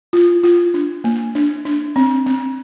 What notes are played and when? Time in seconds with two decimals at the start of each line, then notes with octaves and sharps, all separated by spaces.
0.13 F4
0.44 F4
0.74 D4
1.04 A#3
1.35 D4
1.65 D4
1.96 C4
2.26 C4